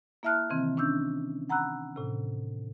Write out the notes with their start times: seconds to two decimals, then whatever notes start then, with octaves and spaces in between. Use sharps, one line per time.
0.23 A#3 E4 E5 A5 F6 F#6
0.50 C3 D#3 E3 C4
0.77 C#4 D4 E6 G6
1.50 F#5 A#5 B5 E6 F#6
1.96 A2 C3